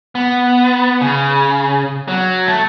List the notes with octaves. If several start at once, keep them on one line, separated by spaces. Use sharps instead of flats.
B3
C#3
F#3
A3